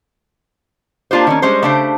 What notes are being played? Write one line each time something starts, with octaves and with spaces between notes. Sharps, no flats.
A#3 D4 F4 G4 C5
D#3 A#3 C#4
G3 G#3 C#4 C5
C#3 A3 D4 G4 C5